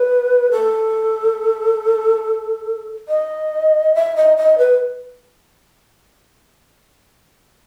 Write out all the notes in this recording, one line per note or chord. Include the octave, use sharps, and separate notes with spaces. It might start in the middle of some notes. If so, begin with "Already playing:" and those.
Already playing: B4
A4
D#5
E5
D#5
D#5
B4